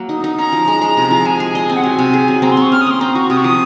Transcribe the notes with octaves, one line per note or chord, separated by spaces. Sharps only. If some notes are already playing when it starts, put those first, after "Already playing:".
Already playing: F#3 A#3
D#4
D#4
C#4 A#5
F3
G#3
G#3
C3
F3
G#3 G#5
G#4
D#5
C4
F#5
F#3 G#5
C3
G#4
F#3
C4 A#5
C6
C4 C#6
C#4 F6
D#6
A#3 C6
C4 A#5
F#4 C#6
C3 D#6
C#6
F3 D#6